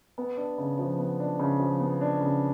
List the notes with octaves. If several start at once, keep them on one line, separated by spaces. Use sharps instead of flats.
B3
D4
C#3
F3
B3
D4
C#3
F3
B3
D4
C#3